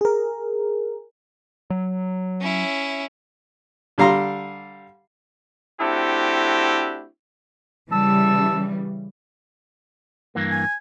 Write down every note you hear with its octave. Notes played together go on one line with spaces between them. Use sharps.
G#4 A#4
F#3
C#4 E4
D3 G3 F5 A#5 C6
A3 C4 D4 E4 F#4 G4
C#3 E3 G3 A5 E6
G2 E3 A#3
G#5